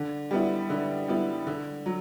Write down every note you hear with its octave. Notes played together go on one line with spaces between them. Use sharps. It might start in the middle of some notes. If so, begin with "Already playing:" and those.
Already playing: D3
G3 B3 E4
D3
G3 B3 E4
D3
F#3